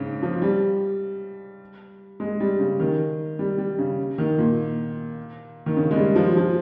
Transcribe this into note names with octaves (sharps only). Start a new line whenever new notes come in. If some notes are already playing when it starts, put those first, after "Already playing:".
Already playing: G#2 C#3
F3
G3
G#3
G3
C#3
D#3
G3
G3
C#3
D#3
A#2
D#3
C#3
G#3
G3
F3
F3